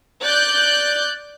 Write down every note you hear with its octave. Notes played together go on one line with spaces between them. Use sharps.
D5 F#6 G6